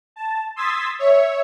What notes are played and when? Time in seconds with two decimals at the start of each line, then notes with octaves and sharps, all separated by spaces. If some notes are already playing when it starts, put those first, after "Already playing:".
0.16 A5
0.56 C6 D#6 E6 G#6 A6 B6
0.99 C#5 E5